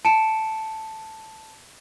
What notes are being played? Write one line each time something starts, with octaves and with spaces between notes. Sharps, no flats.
A5 C#7 D7 E7